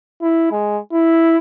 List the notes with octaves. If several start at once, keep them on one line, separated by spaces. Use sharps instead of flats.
E4
G#3
E4